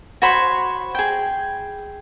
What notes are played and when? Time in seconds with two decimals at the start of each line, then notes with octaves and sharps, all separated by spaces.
0.22 F#4 C5 C#5 B5
0.95 G#4 G5